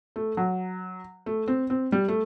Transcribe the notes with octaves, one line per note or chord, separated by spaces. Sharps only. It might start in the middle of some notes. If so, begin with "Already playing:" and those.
A3
F#3
A3
C4
C4
G3
A3